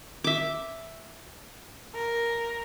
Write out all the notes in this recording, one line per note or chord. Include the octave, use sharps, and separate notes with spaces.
E5 D6
A#4